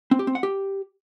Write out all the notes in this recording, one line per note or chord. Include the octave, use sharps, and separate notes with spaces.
C4
G4
C4
F#5
G4